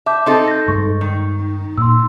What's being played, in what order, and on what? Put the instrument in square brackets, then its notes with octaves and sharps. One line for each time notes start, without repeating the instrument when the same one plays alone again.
[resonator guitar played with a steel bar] E5 [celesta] A5 D6 G6
[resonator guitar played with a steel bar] C4 D#4 A4
[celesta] G6 A#6
[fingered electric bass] G2 G#3 [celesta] C#6
[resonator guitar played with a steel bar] D#3
[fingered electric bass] A#2 [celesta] C6 E6